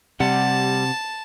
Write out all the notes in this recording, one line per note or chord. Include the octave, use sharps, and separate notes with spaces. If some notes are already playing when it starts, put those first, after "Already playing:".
C3 G3 F#5 A5